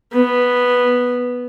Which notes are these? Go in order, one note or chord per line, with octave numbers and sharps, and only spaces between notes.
B3